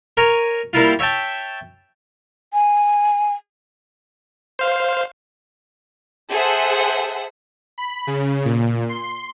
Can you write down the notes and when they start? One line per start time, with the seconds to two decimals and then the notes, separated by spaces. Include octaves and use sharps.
0.17 A#4 C#5 G#5
0.73 G3 A#3 E4 F4
0.99 C#5 E5 G5 A5
2.53 G#5
4.59 C5 F5
6.30 G#4 A4 C5 E5 F#5
7.78 B5
8.07 C#3
8.45 A#2
8.89 C6